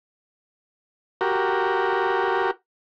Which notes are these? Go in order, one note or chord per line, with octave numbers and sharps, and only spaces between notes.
F#4 G4 A#4